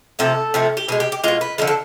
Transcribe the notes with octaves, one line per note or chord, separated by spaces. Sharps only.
C3 F3 A3 A4
C3 F3 A3
G4
B2 G#3 G#4
G4
G4
B2 G#3 F4
B4
D3 F3 G#3 A#4
A4